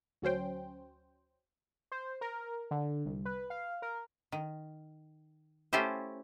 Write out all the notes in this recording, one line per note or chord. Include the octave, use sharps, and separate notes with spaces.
D2 F#3 C#4 C5 G5
C5
A#4
D3
C2
B4
F5
A#4
D#3
A3 C#4 E4 F4 G4 C5